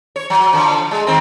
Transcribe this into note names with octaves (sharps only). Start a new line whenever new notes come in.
C#5
F#3
D3 F3
G#3
D#3 C4